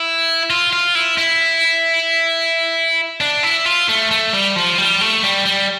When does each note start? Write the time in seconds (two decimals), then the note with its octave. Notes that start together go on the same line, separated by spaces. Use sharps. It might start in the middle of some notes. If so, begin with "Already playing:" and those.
Already playing: E4
0.50 F4
0.73 F4
0.95 E4
1.18 E4
3.21 D4
3.43 E4
3.66 F4
3.89 A3
4.11 A3
4.33 G3
4.56 F3
4.78 G3
5.01 A3
5.23 G3
5.46 G3